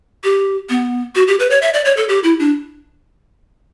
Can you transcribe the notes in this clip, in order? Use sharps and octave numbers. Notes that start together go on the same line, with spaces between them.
G4
B3
F#4
G4
B4
C#5
E5
D5
C#5
A4
G4
E4
D4